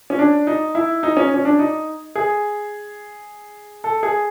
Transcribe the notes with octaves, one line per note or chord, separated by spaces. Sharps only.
C#4
D4
D#4
E4
D#4
C#4
C#4
D4
D#4
G#4
A4
G#4